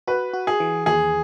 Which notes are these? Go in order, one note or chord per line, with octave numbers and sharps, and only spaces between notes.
F#4 B4
F#4
G#4
E3
D#2 G#4